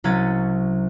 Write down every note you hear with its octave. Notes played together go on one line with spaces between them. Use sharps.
C2 F#3 C#4 G#6 A6 D#7